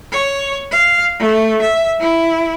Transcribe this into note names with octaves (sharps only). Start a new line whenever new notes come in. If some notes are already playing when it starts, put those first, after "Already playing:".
C#5
F5
A3
E5
E4